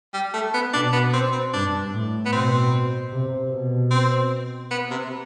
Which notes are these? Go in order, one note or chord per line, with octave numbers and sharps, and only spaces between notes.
G3
A3
B3
B2 D4
B3
C4
C4
G2 D4
A2
B3
B2 C4
C3
B2
C4
B3
C3